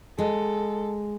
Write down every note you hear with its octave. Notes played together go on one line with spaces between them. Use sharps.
G#3 A4